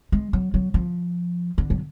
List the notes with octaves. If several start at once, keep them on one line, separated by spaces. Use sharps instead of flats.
G#3
F#3
F#3
F3
D3
F#3